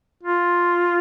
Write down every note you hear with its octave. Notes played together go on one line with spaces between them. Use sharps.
F4